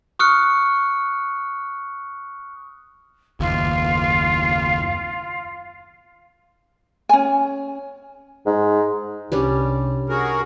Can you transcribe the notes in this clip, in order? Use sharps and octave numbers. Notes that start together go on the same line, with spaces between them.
C#6 D#6 F6 F#6 C#7
F#1 D#2 F4
C#4 G#5
G#2
C2 G3 C#4 D4
F#4 G#4 A#4